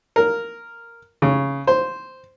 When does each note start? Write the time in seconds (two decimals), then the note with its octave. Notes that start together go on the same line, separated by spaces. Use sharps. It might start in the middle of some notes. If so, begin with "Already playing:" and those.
0.16 A#4
1.22 C#3
1.67 C5